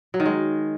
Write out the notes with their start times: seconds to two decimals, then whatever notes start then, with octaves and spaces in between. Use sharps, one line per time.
0.14 F#3
0.20 D#3
0.26 G#3